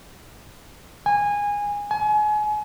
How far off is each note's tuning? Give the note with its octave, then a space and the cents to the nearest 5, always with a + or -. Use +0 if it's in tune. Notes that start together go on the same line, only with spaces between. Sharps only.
G#5 -20
G#5 +30